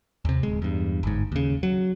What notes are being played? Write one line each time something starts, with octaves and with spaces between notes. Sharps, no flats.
D#2 C3
D1 G#3
E2 G2
G1 G#2
D#2 C#3
F#3